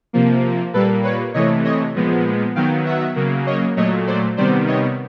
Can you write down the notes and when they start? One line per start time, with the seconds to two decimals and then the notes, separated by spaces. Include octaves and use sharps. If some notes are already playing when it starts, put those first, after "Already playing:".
0.13 C3 F3 A#3
0.74 A#2 G3 A#3 A4 B4
1.04 B4 C#5
1.34 C3 E3 A3 C#5 D#5
1.65 C#5 D#5
1.95 A#2 F3 G#3 B3
2.55 D#3 F#3 B3 F5 G5
2.85 E5 F#5
3.16 C#3 F#3 A#3
3.46 C#5 D#5
3.77 A#2 F#3 A3 C#5 D#5
4.07 C5 D5
4.37 C3 D#3 G3 B3 C5 D5
4.67 C#5 D#5